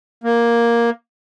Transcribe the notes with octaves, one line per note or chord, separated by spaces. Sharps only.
A#3